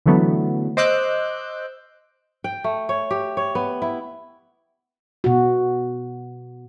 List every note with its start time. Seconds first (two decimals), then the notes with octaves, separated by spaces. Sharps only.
0.06 D3 E3 F#3 A3 B3
0.77 C5 D#5 D6 E6 F#6 G6
2.44 G5
2.64 A3
2.89 C#5
3.11 G4
3.37 C#5
3.55 B3
3.82 E4
5.24 B2 F#4